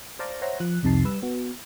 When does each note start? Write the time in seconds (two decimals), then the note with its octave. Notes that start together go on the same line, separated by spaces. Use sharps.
0.19 C5 D5 F5 A5 A#5 D6
0.42 C5 C#5 E5 F#5 A#5 C6
0.60 F3 F#6
0.83 C2 F2 C3 D#4 A5 C7
1.04 G3 B4 E6
1.23 B3 F#4